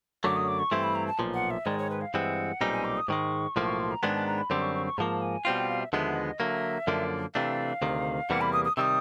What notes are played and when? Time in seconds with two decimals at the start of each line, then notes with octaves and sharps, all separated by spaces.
0.24 F#2 D3 F#3 A3 D6
0.36 D#6
0.48 D6
0.59 C#6
0.71 G2 E3 A3 C4 E4 C6
0.83 B5
0.95 A#5
1.07 A5
1.19 B1 A#2 F3
1.34 F#5
1.50 E5
1.66 G#2 D#3 G#3 D5
1.78 C#5
1.90 B4
2.01 F5
2.14 G2 E3 G#3 C4 F#5
2.61 B1 A#2 G3 C4 D#4 G#5
2.73 G#5
2.84 D6
2.97 D#6
3.08 G#2 D#3 G#3 C#6
3.55 B1 A2 F3 A#3 C6
3.67 C#6
3.79 C6
3.91 A#5
4.02 G#2 D#3 G#3 B3 D4 A5
4.15 A5
4.26 A#5
4.38 B5
4.50 F#2 D3 G3 C4 C6
4.62 C#6
4.75 C#6
4.86 C#6
4.98 G#2 F3 A#3 A5
5.22 G#5
5.45 B2 G3 C4 F4 G5
5.56 G5
5.69 F5
5.80 E5
5.93 D#2 D3 F3 G#3 B3 E5
6.15 D#5
6.40 D3 F#3 A#3 E5
6.87 F#2 D3 F3 A#3 D4
7.34 C3 E3 A3 D4 F5
7.82 D2 C3 D#3
8.29 E2 C3 E3 G3 A#3 F#5
8.41 B5
8.53 D#6
8.65 D#6
8.77 C3 D#3 G3 D#6 E6